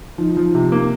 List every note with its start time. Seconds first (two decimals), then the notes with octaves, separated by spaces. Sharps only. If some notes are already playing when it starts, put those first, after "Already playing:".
0.18 F3 D#4
0.37 F3
0.55 C3
0.71 A#3 D#4